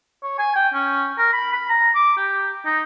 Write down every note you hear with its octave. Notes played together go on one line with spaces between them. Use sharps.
C#5
G#5
G5
C#4
A#4
B5
B5
A#5
D6
G4
D#4